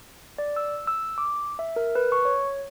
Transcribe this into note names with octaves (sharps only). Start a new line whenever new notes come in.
D5
E6
E6
D6
E5
A#4
B4
C#6
C#5